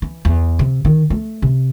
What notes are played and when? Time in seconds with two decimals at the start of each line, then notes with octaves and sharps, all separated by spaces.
0.02 E3
0.25 E2
0.59 C3
0.85 D#3
1.10 A3
1.42 C3